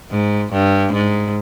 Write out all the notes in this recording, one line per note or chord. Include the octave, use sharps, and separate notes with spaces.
G#2
G2
G#2